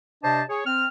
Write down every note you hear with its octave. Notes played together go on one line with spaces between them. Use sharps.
C3 D4 C5 D#5 A5
G#4 C#5
C4 F6